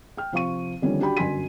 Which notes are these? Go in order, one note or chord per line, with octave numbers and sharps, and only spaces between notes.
G5 F6
C3 F3 F4 F5 C#6 D#7
D3 D#3 F3 G3 B3 C#4
D4 F#4 G4 G5 B5
G1 F#2 G#5 C6 B6 D#7